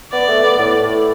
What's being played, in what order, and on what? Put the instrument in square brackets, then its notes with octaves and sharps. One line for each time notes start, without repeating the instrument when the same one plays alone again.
[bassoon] B3 [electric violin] D5
[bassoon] A3
B3
A2
A2